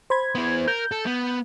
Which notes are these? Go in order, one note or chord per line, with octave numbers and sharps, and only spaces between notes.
C5 B5 G#6
B3 E4
A#4 G6
A4
B3